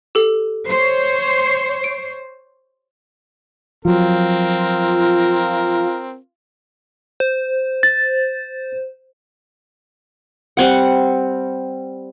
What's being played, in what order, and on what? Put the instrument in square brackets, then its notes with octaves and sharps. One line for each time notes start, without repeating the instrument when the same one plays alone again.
[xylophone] G4 A4
[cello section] C5 C#5
[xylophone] D7
[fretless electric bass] F3 F#3 [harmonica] C4 A#4 [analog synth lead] F4
[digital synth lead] C5
[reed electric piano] A6
[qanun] G3 C4 F#5